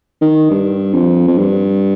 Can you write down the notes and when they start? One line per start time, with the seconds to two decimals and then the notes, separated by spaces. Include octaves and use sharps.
0.21 D#3
0.50 G2
0.94 F2
1.27 F2
1.38 G2